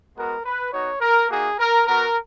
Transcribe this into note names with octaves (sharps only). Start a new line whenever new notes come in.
G#3 B3 F#4 A#4
B4
B3 D#4 F#4 C#5
A#4
A#3 D#4 F#4 G#4
A#4
B3 F#4 A#4